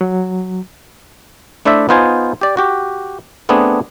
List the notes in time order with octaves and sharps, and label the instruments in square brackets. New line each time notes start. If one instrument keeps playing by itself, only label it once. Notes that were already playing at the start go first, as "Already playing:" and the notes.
[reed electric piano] F#3
[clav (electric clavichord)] A3 D4 E4 C5 D5 E5
B3 D#4 F4 C5 G#5
G4 D5
F#4 G4
A3 B3 C4 D4 G#4